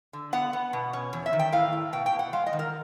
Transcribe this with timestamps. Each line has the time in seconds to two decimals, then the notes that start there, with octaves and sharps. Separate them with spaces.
0.13 D3
0.33 B3 F#5
0.53 B3
0.73 B2
0.93 C#4
1.13 E2
1.26 E5
1.33 D#3
1.39 G5
1.53 A2 F5
1.73 A2
1.93 B2 G5
2.06 G5
2.12 B2
2.19 F#5
2.33 G#3 F5
2.46 D#5
2.53 D#3
2.59 A#4